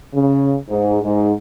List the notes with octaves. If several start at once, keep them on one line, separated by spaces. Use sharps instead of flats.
C#3
G#2
G#2